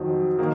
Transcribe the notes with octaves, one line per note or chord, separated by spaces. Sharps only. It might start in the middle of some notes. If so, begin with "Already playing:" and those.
Already playing: F2 D#3 F#3
D#3 A#3